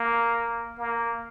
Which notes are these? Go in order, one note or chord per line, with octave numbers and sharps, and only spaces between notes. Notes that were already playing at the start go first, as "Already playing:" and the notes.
Already playing: A#3
A#3